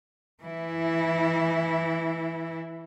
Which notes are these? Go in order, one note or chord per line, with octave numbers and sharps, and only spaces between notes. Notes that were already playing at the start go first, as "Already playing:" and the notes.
E3 E4